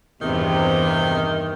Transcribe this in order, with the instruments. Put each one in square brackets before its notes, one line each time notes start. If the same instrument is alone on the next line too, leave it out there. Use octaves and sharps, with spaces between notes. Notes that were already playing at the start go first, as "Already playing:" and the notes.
[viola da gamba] E2 G2 [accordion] C3 [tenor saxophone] D#3